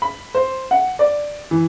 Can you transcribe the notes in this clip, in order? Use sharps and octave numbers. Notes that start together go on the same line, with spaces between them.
B5
C5
F#5
D5
E3